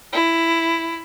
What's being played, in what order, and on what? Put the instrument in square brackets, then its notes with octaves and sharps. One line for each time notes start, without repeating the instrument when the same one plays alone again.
[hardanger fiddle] E4